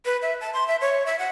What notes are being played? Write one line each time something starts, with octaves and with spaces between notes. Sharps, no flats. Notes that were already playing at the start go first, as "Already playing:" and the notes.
B4
E5
A5
C6
E5
C#5
E5
F#5